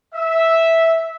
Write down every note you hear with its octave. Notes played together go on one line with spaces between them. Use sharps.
E5